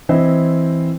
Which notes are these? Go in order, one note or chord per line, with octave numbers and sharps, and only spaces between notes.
E3 C4 E4 C5 D#5